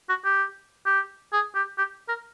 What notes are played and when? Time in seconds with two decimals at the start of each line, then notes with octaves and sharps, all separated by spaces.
0.09 F#4
0.25 G4
0.86 G4
1.33 G#4
1.55 G4
1.78 G4
2.09 A#4